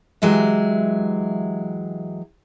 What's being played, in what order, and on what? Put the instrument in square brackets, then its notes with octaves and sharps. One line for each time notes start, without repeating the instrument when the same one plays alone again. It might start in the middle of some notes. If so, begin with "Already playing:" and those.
[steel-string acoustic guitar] E3 F#3 G#3 G4 E5